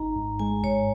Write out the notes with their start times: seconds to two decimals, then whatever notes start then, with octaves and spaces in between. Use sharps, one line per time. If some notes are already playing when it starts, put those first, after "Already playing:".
Already playing: G#1 D#4 A#5
0.16 G#2
0.39 G#3 G#5
0.63 G#2 C#5